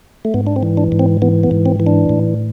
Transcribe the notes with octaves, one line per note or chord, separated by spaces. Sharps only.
A3
G#2 B3
D4
C4
E3
D4
G#2
C4
E3 B3
B3
G#2
C4
E3
D4
A2